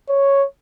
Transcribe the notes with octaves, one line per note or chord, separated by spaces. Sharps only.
C#5